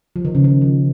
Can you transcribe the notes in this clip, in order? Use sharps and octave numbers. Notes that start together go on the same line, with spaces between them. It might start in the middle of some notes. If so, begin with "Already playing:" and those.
F3
D#3
C#3
D#3
F3